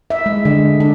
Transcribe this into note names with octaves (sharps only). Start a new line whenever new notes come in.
E5
G#3
D3
D4